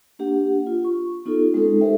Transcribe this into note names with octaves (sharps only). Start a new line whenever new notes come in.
A#3 D4 G4 F#5
F4
C#6
B3 D#4 F4 G4 A4
G#3 C4 C#4 D#4 A4
G4 A4 A#4 C5 E5 G5